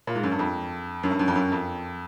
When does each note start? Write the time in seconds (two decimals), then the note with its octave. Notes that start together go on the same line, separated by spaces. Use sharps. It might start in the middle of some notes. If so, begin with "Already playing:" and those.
0.07 A#2
0.15 G#2
0.23 F#2
0.31 G2
0.39 F2
1.03 F#2
1.11 G2
1.19 F#2
1.28 F2
1.36 F#2
1.52 F2